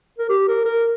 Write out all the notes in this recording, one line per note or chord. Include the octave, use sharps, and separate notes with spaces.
A#4
G4
A#4
A#4